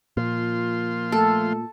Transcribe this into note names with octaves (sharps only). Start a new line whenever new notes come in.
A#2 F3 F4 C6
A3 A4